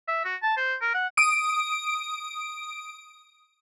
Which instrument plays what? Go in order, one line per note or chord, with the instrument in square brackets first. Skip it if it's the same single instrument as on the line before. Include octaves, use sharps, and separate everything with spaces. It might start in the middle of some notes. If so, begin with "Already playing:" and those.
[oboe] E5
F#4
A5
C5
A#4
F#5
[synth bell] D#6 D7